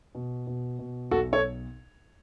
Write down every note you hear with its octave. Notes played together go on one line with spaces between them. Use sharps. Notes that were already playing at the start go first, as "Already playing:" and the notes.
B2
B2
B2
B1 F#4 A4
A4 C#5